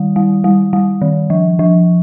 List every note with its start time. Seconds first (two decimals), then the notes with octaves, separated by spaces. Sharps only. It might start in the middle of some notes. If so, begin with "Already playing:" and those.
Already playing: D#3 G3
0.16 G3
0.44 G3
0.73 G3
1.02 D#3
1.30 F3
1.59 F3